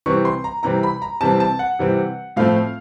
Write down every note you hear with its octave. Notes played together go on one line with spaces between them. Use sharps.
C3 E3 G3 C4 C#6
C6
A#5
C3 E3 G3 C4 A#5
B5
A#5
C3 E3 G3 C4 A5
A5
F#5
C3 E3 G3 C4
A2 F3 A3 C4 F5